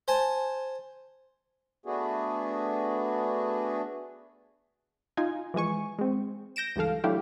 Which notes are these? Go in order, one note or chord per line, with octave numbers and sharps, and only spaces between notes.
C5 G#5 A5
A3 B3 D4 F#4 G#4
D#4 F4 G#5
E3 F3 G#3 G#5 C#6
G#3 C4
G6 A#6 D7 E7
C#2 G2 E3 A4 F5
F#3 A3 D4 E4 G4 F5